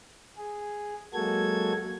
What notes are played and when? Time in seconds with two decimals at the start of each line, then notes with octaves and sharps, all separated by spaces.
0.37 G#4
1.14 F#3 G#3 A#3 F#4 A4 G#6